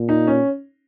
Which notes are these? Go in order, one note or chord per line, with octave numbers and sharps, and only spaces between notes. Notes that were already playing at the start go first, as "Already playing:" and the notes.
Already playing: A#2
D#4
C#4